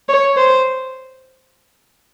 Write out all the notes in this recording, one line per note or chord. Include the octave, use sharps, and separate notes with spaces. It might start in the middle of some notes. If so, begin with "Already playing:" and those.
C#5
C5